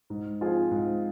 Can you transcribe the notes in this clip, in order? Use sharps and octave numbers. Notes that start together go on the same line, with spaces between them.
G#2
F3 C4 F4 G#4
G#2